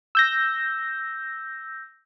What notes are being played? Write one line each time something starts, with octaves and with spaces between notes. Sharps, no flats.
E6 G6 A#6